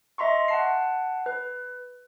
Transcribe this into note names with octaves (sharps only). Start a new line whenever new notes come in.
D#5 E5 A#5 C6 C#6
F#5 A5 C7
B4